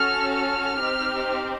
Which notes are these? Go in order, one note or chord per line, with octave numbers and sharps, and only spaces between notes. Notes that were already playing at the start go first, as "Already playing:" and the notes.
Already playing: C#4 F#4 A4 F6
F6
C4 D#4 G4